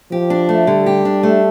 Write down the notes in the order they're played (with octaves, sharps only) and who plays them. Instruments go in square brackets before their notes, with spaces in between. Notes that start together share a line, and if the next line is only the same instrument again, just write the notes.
[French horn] F3 [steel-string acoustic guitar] G4
[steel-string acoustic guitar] D4
A3
[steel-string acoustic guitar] D3 [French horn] G3
[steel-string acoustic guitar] G4
D4
A3